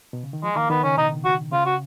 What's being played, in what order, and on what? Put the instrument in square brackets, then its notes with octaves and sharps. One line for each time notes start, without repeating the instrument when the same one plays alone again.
[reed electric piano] B2
C#3
D#3
[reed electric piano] F3 [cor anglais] G#3
[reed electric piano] D#3 [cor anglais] A#3
[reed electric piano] D#3 [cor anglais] B3
[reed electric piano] C#3 [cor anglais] C#4
[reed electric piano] B2 [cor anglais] D#4
[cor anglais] F#4
[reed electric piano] C#3 [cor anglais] F4
[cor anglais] F#4